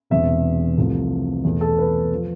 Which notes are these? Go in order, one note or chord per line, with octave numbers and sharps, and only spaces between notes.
E1 E2 C3 E5
C2 C3 F3 A3
E2 B2 A3
A4
B4
F3